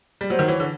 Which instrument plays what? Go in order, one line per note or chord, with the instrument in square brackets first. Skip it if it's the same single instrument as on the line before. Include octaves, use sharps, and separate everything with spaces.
[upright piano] G3
[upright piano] F#3 [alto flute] C5
[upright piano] D#3
[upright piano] E3 [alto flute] C#5
[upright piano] D3